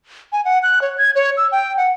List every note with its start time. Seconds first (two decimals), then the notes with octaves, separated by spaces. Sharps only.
0.32 G#5
0.45 F#5
0.63 F#6
0.82 C#5
0.98 G#6
1.15 C#5
1.37 E6
1.52 G5
1.77 F#5